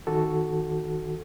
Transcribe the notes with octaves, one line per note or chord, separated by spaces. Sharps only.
D#3 F#4 A4